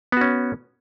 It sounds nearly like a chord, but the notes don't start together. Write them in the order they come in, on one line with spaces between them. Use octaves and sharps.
B3 F#4 C#4